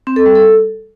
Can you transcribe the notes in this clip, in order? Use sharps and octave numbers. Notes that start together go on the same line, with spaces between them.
C4
A4
G3
A4